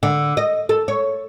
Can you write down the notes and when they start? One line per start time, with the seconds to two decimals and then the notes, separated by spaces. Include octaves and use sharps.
0.03 D3
0.37 D#5
0.69 A4
0.88 C#5